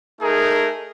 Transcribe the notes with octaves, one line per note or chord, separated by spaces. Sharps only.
A3 D#4 G#4 A#4